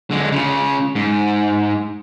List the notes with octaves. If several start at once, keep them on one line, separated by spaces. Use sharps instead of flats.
D3 G#3
C#3 F4
G#2